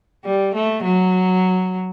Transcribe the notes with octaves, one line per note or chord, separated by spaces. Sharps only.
G3
A3
F#3